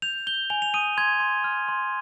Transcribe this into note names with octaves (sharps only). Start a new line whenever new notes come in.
G6 F7
G6 G7
G#5 F7
F7
D#6 D#7
C6 G#6
C6
F6
C6